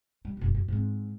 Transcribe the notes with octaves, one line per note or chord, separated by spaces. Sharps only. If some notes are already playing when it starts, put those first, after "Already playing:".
G3
F#1 B1
F#2
G#2 C4